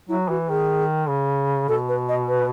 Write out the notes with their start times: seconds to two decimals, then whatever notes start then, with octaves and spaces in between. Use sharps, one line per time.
0.09 F#3 E4
0.29 E3 F#4
0.48 D#3 G#4
1.09 C#3
1.68 B2 A4
1.89 B4
2.09 D#5
2.28 B4